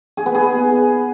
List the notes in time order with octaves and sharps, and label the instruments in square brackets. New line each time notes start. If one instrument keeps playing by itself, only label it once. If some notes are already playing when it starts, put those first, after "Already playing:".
[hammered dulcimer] G#4
B3
G#4